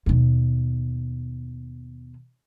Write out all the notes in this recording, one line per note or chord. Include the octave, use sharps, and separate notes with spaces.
D#2 B2